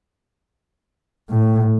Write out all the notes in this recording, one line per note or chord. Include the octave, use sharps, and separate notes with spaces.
A2